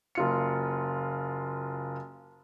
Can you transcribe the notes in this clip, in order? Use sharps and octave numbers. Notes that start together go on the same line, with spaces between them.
F#1 F4 C#7